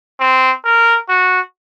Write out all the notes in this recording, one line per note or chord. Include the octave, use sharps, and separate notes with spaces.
C4
A#4
F#4